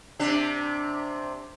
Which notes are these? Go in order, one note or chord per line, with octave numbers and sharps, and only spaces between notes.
C3 D4